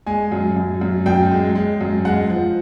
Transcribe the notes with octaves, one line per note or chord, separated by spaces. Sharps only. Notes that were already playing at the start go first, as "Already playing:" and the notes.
G#3 G#5
F#2
F#2
F#2
F#2 G5
G#3
G#3
F#2
G#3 F#5
F3